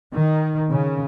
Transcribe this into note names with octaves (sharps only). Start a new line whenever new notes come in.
D#3
C#3